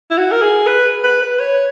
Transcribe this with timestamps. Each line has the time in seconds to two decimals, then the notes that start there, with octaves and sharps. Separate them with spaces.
0.10 E4
0.18 F#4
0.32 A#4
0.42 G#4
0.67 B4
1.04 B4
1.22 B4
1.40 C#5